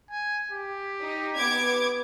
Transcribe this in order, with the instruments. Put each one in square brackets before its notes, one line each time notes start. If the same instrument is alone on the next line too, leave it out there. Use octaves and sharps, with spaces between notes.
[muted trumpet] G#5
G4
[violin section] D#4
B3 D6 G#6